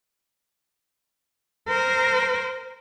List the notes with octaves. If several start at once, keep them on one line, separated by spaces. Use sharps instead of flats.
A#4 C5